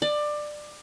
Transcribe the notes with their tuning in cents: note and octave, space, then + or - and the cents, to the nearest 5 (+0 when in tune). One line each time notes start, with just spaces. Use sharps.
D5 +20